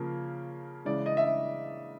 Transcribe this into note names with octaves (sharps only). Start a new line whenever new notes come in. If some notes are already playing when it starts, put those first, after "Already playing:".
Already playing: C#3 F3 A#3
C#3 E3 G#3 D5
D#5
E5